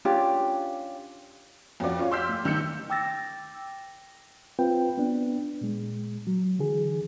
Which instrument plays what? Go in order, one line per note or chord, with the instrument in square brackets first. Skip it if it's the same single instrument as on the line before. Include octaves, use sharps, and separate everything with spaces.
[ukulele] C#4 D4 F4 G4
[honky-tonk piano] F2 C#4 F#4 D5
C#4 F4 C#5
C6 D6 E6 F6 G6 B6
A2
C2 D#3 E6 G6 C#7
[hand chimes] G5 D6 E6 A6 A#6
[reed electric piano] C4 F4 B4 G5
B3 D4
A#2 G#3
F#3
D3 E3 G#4